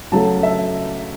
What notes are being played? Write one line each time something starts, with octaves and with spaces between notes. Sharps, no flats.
C#3 F#3 A3 A5
E5